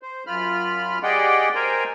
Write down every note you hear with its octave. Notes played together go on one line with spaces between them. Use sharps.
C5
F#2 F4 B5 F6
G4 G#4 D5 D#5 F#5 G5
A#4 C5 G5 G#5 A#5